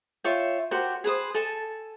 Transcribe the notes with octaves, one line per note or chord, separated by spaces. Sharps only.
F4 C#5 E5 G5
F#4 G4 A#4 C5
G#4 B4 C5 D#6
A4 G#5 A5